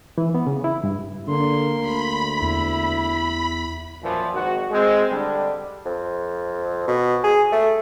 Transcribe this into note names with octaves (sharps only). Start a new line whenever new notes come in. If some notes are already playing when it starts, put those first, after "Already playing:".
E3
B3
C#3
E4
G2
D3 A#3 C6
D2 B5
E2 E4
F#2 A#2 E3 F3
G#1 F#4
G#3 C4
D3 G3 D4
F2
B2
G#4
A3